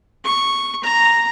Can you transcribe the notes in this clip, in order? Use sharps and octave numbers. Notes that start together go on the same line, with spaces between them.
C#6
A#5